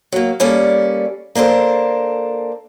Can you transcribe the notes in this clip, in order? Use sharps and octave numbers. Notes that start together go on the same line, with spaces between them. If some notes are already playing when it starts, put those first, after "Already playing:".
F#3 A#3
G3 A#3 C#4 A4 D5
A#3 D4 A4 C5